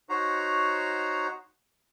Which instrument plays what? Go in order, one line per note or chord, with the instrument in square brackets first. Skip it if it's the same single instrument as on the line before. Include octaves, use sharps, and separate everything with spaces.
[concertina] D#4 F#4 C5 C#5 A#5